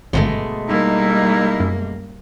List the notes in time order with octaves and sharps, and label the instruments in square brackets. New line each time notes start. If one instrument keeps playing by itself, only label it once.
[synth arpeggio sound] G#1 G2 D3 [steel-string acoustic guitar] B2 G#3 A3
[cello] G3 A#3 [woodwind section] D#4 E4
[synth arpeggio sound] F#2